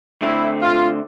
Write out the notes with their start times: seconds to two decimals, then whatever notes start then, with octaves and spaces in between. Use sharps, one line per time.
0.22 D3 A3 C4 E4
0.61 F4